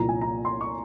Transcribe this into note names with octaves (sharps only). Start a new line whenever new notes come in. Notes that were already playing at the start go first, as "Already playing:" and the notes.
Already playing: C2 A#2 F3 A#5
G#5
A#5
C6
C#6